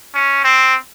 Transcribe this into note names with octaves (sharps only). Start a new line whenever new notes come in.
C#4
C4